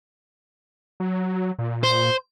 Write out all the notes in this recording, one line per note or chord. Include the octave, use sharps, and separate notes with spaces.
F#3
A#2
C5